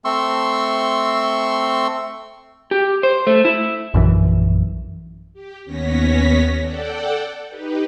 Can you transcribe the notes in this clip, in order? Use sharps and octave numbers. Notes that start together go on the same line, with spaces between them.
A3 C4 C6 C#6 E6
G4
C5
A3
E4
A#1 F#2 E3
G4
D#2 B3 C#4 C#5 A#6 B6
A4 D5 F#5 G5
D#4 G4 B4